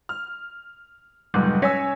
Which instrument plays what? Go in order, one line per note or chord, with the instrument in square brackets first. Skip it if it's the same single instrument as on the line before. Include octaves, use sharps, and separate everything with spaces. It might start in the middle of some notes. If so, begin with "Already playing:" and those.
[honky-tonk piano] F6
[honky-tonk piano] F1 C#2 G#2 [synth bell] F#3 G3
[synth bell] C#4 A#6 B6 [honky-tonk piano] C#5 G#5 E6